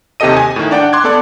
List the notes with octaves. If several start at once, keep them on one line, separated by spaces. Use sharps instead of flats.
D#2 C3 G4 A4 D#5 D#7
G#5
A2 D#3
D4 D5 F#5 G5
C6 D6 F#6 G#6
B3 A4 D5